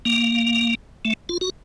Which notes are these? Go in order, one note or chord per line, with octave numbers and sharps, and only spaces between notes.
A#3
A3
F4
F#4